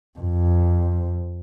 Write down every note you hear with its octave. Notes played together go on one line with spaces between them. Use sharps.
F2